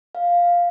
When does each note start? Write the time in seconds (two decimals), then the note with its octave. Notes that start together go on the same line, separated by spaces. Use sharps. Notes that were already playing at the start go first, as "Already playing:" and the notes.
0.15 F5